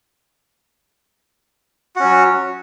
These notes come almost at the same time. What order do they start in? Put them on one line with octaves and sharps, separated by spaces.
F#4 C#4 F#3